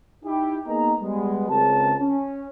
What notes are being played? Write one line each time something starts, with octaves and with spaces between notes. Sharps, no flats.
D#4 E4 G4
A#3 B3 D#4 G#4 D#5 A#5
G3 G#3 B3
C#2 C#3 C4 A#4 A5
C#4